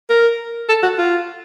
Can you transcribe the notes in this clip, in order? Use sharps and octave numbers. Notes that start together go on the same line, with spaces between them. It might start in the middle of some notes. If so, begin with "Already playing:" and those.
A#4
A4
F#4
F4